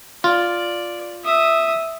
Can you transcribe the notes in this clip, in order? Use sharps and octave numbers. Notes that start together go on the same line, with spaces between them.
F4 D5
E5 D#6